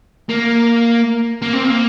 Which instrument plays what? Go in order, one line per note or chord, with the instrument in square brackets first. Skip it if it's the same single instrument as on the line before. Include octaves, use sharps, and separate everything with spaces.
[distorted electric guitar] A#3
A#3
C4
A#3